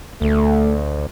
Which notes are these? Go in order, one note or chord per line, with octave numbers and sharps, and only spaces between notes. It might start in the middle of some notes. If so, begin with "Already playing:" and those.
D2 A3